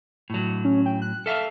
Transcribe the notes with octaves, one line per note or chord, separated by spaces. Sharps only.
A2 F#3
C#4
G5
F#6
A4 E5 F5 F6